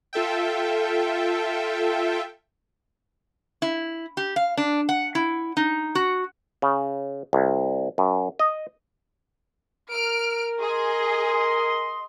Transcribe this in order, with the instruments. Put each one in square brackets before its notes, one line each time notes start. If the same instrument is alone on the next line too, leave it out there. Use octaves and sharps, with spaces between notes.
[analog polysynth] F4 A4 E5 G5
[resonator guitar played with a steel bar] E4
G4
F5
D4
F#5
E4
D#4
F#4
[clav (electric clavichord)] C#3
C2
F#2
D#5
[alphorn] A#4 [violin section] F6 D7
[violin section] G#4 [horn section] D#5 C6